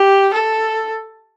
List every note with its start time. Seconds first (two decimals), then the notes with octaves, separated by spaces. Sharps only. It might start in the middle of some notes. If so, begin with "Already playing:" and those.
Already playing: G4
0.34 A4